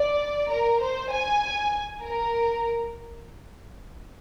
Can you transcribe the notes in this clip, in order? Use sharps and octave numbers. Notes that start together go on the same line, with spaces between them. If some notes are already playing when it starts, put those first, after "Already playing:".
Already playing: D5
A#4
C5
G#5
A#4